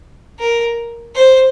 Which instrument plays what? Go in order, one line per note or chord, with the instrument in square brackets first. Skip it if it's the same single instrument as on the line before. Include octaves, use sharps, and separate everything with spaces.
[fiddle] A#4
C5